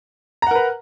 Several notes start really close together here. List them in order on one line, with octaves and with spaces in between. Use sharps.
A#5 F#5 A#4 B4